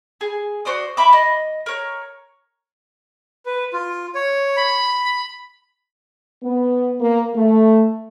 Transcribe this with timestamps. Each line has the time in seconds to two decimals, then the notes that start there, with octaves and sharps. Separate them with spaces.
0.21 G#4
0.65 F#4 C5 D5 D#6
0.97 E5 B5 D6
1.13 D#5
1.66 A#4 C#5
3.46 B4
3.73 F4
4.15 C#5
4.57 B5
6.43 B3
7.00 A#3
7.35 A3